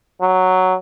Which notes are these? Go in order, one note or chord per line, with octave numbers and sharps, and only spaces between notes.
F#3